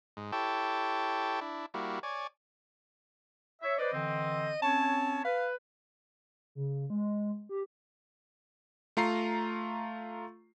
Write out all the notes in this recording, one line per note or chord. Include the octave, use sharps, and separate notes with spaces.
G#2
E4 G4 A4 C#5 G5 A5
D4 E4
G3 A#3 E4 F#4
C#5 D5 G#5
C#5 E5
B4 C5 D5 D#5
D3 E3 C4
C4 C#4 C#5 A5
B4 F5
C#3
G#3
G4
A3 F4 A#5 C7